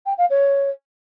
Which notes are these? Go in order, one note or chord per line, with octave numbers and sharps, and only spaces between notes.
G5
F5
C#5